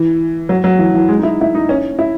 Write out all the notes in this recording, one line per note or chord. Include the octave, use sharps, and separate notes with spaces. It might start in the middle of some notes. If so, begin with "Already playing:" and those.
Already playing: E3
F#3
F#3
E3
E3
G#3
D#4
E4
E4
D#4
C#4
E4